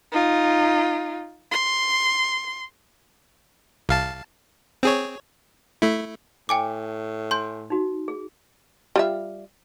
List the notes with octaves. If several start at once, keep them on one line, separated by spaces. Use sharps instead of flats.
D#4 F4
C6
C2 F5 A5
C4 G#4 C#5
A3 E4
A2 G5 G#5 D6
G#5 C6 G6
D#4 F#4
G#4
G3 F4 E5